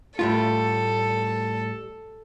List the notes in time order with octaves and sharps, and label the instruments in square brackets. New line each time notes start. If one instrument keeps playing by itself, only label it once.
[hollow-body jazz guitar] A2 G3 F4 [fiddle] A4